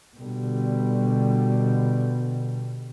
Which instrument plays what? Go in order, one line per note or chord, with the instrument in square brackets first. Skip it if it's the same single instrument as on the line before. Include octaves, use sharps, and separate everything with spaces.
[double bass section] B2 D3 G3